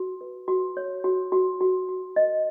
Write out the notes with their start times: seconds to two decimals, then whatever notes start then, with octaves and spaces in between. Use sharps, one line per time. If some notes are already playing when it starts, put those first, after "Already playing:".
Already playing: F#4
0.21 B4
0.48 F#4
0.77 C#5
1.04 F#4
1.32 F#4
1.61 F#4
1.89 F#4
2.16 A#4 D#5